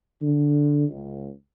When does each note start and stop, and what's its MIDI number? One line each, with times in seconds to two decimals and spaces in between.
0.22 0.88 50
0.89 1.29 37